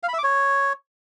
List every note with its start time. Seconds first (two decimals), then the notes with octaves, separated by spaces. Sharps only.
0.03 F5
0.08 B5
0.13 E5
0.18 D6
0.24 C#5